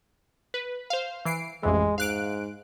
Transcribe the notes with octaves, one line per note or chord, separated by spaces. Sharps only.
B4
C5 F5
E3 C7 D7
A1 F2 E3 G#3
G#2 F5 F#6 D7